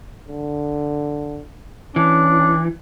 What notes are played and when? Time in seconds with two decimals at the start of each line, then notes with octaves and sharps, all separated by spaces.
0.28 D3
1.96 E3 C#4 D4